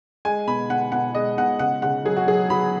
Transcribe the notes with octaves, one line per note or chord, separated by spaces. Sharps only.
G#3 G#5
B2 B5
B2 F#5
B2 F#5
G#3 D#5
B2 F#5
C#3 F#5
C#3 F#5
F#3 G#4
F#4
F#3 G#4
F#3 B5